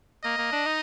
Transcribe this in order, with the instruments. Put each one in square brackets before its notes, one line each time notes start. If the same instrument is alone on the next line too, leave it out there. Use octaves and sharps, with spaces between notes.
[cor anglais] A#3 [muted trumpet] D#5
[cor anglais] A#3
D4
D#4